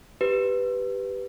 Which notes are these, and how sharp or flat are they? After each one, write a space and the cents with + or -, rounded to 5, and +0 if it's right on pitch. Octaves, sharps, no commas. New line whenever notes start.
G4 +0 B4 +0